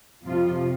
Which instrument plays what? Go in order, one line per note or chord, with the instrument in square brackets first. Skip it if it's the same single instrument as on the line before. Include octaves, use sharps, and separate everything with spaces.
[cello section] F2 C3 F3 F4